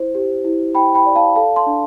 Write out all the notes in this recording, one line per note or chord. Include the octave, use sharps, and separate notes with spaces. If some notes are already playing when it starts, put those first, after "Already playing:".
Already playing: E4 C5
G4
E4
E4 G5 B5
G5 B5
D5
F5 A5
A4 F5 A5
A5 C6
D4